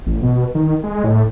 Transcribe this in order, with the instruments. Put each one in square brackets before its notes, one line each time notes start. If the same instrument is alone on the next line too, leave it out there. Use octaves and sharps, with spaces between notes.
[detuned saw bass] A1
B2
D#3
G#3
A2